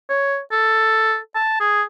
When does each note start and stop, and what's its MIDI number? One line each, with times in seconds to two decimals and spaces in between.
0.09 0.38 73
0.52 1.17 69
1.35 1.57 81
1.60 1.83 68